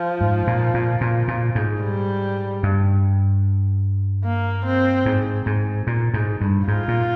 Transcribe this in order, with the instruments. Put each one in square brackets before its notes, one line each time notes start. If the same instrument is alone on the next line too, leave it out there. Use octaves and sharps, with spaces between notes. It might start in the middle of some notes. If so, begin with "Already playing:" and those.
Already playing: [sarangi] F3
[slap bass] G#2
A#2
A#2
A#2
A#2
G#2
[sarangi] G3
[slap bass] G2
[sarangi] A#3
C4
[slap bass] G#2
G#2
A#2
G#2
G2
[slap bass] G#2 [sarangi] F4
[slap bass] A#2